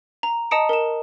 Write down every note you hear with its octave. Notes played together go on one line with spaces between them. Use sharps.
A#5
D#5 A5 A#5 D#6 C#7 D7
A#4 E7